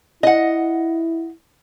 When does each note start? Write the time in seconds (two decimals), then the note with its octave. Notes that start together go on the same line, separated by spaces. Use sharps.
0.23 E4 D#5 F#5